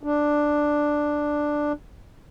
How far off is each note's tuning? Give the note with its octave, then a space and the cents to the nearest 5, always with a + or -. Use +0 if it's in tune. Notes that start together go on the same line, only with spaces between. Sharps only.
D4 +5